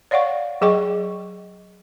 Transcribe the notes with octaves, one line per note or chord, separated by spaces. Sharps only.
C#5 D5 F5 F#5 C#6
F#3 G#4 D#5 G5 C#6